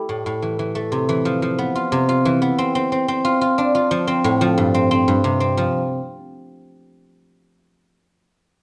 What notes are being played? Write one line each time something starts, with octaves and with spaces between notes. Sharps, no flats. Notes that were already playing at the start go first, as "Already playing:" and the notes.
Already playing: A3 E4 G4
A2
A2
E3
E3
A3
C3
E3
F3
F3
B3
F4
C3
F4
E3
B3
C4
C4
C4
C4
F4
F4
D4
F4
F3
C4
A2
F3
G2
C4
C4
G2
C3
C4
F3